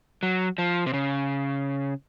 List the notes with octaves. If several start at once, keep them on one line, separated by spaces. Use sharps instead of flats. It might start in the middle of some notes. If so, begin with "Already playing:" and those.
F#3
F3
C3
C#3